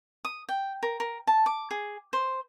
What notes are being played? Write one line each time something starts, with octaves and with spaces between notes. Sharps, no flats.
D#6
G5
A#4
A#4
A5
D6
G#4
C5